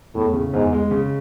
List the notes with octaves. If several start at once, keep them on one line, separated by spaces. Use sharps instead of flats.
E2 A2
C#3
E2 G#2
G#3
C#3